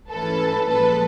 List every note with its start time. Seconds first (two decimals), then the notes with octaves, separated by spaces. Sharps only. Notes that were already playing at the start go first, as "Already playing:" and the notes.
0.11 G#2 E3 A3 C#4 A4 B4
0.68 A#2 F3 G#3 A4 B4